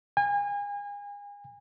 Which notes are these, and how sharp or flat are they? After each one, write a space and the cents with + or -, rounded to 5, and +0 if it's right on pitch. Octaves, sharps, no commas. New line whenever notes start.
G#5 -35